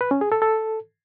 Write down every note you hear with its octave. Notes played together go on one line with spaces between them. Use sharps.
B4
C#4
G#4
A4
A4